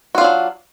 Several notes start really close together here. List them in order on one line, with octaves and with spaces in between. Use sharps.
F#4 F4 D4 F#3